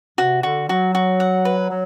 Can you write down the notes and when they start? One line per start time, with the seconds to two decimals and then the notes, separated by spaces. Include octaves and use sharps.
0.18 C3 F#4
0.43 D3 F#4
0.69 F#3 F#4
0.95 F#4
1.20 F#5
1.45 B4
1.70 F#3